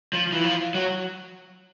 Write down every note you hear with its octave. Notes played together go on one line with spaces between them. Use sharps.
F3
E3
F3
F#3